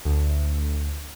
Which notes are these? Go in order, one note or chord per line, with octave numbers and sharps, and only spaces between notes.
D2